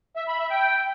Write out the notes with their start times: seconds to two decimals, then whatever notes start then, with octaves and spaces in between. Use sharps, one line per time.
0.16 E5
0.28 B5
0.39 E5
0.51 G5